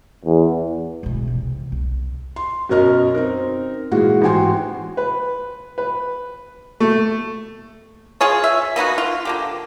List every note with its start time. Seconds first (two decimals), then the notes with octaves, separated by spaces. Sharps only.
0.25 E2
1.03 E1 B2
1.28 E2 C3
1.72 C2
2.36 C6
2.69 F#2 B2 C#4 A#4 D#5 F6
3.14 C4 D#4 A#4
3.92 A#2 E3 G#3 F#4
4.22 A1 G#2 F#4 G5 G#5 C6
4.97 B4
5.78 B4
6.80 A3
8.21 F4 G#4 C#5
8.44 E5
8.76 A#3 B3 D#4 F#4
8.98 F4
9.25 D3 A#3 G4